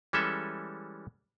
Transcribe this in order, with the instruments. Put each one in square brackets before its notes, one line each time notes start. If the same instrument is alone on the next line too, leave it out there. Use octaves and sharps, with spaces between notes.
[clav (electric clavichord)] E3 G3 G#3 C#4 A4 E5